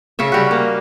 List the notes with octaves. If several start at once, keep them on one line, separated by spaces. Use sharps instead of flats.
C#3 C#4 E5
G3 F#4
A#3